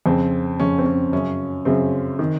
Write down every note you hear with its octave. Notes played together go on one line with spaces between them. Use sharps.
F2 C#3 C4
F2 C#3 C#4
C4
C#4
F#2 C#3 C#4
F#2 C#3 C4
D#3